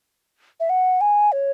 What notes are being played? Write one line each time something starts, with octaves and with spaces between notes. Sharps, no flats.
E5
F#5
G#5
C#5